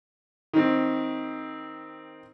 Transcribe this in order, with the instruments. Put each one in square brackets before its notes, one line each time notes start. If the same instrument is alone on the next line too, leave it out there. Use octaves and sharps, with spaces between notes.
[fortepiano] D#3 C4